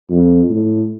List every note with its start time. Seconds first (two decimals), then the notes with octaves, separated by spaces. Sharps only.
0.10 F2
0.49 A2